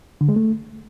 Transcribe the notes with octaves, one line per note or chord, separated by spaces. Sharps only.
D3
G#3
A3